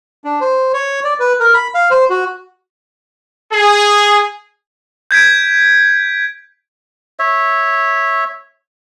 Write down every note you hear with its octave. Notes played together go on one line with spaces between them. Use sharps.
D4
C5
C#5
D5
B4
A#4
B5
F5
C5
F#4
G#4
G6 G#6 B6 D7
C#5 E5